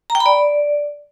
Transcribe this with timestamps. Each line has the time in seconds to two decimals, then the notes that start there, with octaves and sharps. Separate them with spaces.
0.10 A#5
0.15 G5
0.20 B5
0.26 D5